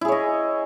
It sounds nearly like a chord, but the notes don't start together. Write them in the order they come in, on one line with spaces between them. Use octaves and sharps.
E4 G#4 C#5 D#5